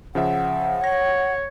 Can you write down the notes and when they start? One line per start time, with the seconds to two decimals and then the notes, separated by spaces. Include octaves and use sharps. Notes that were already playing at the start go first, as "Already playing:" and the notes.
0.15 C#3 F3 E5 F#5
0.84 C#5 A#6